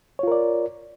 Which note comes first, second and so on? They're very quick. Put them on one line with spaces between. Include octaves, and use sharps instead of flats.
C#5 F4 A#4 D5